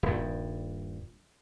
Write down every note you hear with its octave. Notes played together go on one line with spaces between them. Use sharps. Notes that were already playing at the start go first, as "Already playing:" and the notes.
D#1 G2